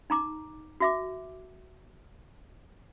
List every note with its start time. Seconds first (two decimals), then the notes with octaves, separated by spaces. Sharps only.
0.10 D#4 A#5 D6
0.80 F#4 E5 D6